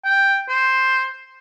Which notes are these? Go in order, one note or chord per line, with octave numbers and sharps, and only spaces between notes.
G5
C5